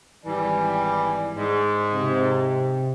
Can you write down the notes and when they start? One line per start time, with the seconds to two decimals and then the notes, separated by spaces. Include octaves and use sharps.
0.26 G#1 E3 G3 D5 G#5
1.37 G#2
1.94 C3